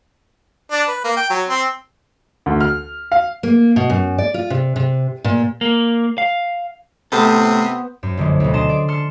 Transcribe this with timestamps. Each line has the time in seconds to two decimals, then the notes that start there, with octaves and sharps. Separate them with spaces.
0.71 D4
0.88 B4
1.04 A#3
1.16 G5
1.30 F#3
1.49 C4
2.46 D2
2.60 F6
3.12 F5
3.43 A#3
3.76 B2
3.90 F#2
4.18 D5
4.34 F4
4.50 C3
4.76 C3
5.24 A#2
5.61 A#3
6.18 F5
7.12 A2 C3 B3 A4 C5 B5
8.03 F#2
8.17 A#1 D3 F#3 G#3
8.40 D2 B2
8.53 D3 D4 D#5 A5 C6 E7
8.69 G#4 D5
8.88 A5 C6 F6 C#7